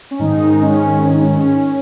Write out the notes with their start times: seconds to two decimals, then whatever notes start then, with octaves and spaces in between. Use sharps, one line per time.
0.11 C#4
0.19 G#2 D#3 G#3 D#4
0.62 C#4
1.04 C#4
1.12 D#4
1.21 C#4